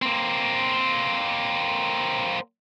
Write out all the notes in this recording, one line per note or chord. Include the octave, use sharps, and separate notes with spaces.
A#3 C4